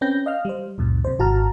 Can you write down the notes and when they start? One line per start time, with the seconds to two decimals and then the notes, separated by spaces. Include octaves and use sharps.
0.01 C4 C#4 B4 G5 G6 A#6
0.26 D#5 F5 F6
0.45 G3 C5
0.78 C#2 F#2 A#2
1.05 C3 C5
1.19 G#1 F#4 A5 A#5 F6